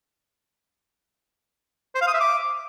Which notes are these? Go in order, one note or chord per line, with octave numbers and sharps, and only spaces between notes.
C5
F5
D#6
E5
D6